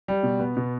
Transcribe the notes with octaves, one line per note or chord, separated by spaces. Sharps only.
G3
B2
B3
B2